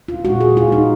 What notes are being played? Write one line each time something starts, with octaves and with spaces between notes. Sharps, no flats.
F4
A#2 G#3 F#4
G#4
F4
D#4